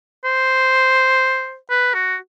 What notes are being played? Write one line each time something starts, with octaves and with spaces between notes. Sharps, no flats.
C5
B4
F#4